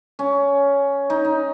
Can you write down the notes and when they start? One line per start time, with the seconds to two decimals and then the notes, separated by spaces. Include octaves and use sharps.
0.19 C#4
1.10 D#4
1.25 D#4